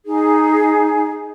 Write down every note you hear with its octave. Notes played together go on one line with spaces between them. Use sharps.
D#4 G#4